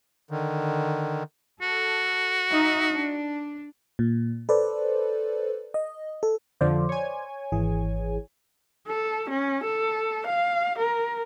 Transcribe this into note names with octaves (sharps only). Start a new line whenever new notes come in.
D3 D#3
F#4 A4
D#4 E5
D4
A#2
A4 B4 C5 D5
D#5
A4
F2 D3 F3 C5 D5
C#5 G#5
G#1 E3 G#4
A4
C#4
A4
F5
A#4